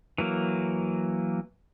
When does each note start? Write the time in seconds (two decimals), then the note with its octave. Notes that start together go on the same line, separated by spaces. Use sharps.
0.18 E3 F#3 A#3